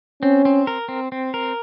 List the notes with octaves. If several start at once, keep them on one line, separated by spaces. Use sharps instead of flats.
C4 C#4
C4
A#4
C4
C4
A#4